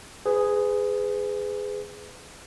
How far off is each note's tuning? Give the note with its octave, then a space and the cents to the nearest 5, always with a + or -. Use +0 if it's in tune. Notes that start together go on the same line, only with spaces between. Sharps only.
G#4 +0 B4 +35